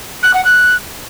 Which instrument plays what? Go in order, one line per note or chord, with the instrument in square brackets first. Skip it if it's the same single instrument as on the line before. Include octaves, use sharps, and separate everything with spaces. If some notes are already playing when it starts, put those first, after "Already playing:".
[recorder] F#6
F#5
F#6